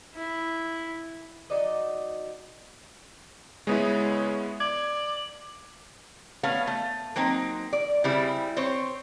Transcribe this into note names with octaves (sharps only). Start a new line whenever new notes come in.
E4
F#3 D#4 D5 D#5
C#3 G#3 B3 E4
D5 G#6
A3 B3 C#4 F5
A3
F#3 A#3 C4 D#4
D5
C#3 G3 C4 E4
C4 C5 C#5